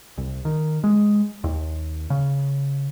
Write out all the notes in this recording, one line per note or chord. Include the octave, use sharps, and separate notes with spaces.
C2
D#3
G#3
D#2
C#3